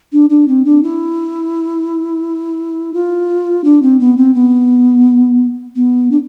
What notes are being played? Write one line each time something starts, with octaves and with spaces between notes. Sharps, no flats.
D4
D4
C4
D4
E4
F4
D4
C4
B3
C4
B3
B3
D4